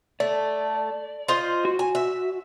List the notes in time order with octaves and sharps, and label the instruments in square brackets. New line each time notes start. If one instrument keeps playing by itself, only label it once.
[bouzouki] A3 [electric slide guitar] D5
[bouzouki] F4 C5 D#5
[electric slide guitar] F#4
[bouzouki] G#5
E5